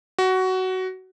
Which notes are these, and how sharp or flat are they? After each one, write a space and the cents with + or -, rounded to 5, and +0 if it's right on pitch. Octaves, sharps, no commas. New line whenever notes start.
F#4 +15